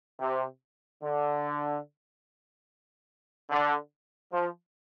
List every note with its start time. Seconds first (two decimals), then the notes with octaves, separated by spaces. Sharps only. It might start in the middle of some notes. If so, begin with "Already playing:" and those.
0.20 C3
1.03 D3
3.50 D3
4.33 F3